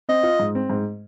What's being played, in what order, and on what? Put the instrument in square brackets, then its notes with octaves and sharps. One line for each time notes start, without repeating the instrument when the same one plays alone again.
[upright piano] C4 [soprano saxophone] D#5
[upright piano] F4
G#2
C4
G#2